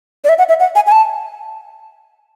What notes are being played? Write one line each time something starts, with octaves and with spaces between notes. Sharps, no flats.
D5
E5
F#5
E5
F#5
G#5
G#5
A5